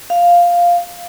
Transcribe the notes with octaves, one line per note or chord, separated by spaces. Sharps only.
F5